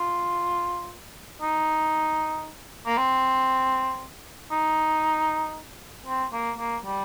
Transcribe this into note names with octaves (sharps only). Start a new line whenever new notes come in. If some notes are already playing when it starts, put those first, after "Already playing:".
Already playing: F4
D#4
A#3
C4
D#4
C4
A#3
A#3
G3